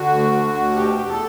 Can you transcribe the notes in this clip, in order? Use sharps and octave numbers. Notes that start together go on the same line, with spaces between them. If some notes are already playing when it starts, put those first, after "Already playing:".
Already playing: D3 F#4
D2
D3
D2
B2 G4
E2
A4